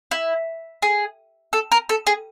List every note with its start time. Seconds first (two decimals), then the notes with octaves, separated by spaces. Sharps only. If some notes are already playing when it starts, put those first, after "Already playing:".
0.11 E4
0.82 G#4
1.53 A4
1.72 A#4
1.89 A4
2.07 G#4